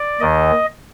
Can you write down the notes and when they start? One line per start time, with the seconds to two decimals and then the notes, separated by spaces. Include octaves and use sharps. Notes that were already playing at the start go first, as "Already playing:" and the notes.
Already playing: D5
0.21 D#2 D#3 D#5